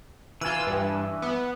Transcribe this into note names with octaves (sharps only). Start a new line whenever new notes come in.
E3 F4 B4 G#5 E6
G2
B3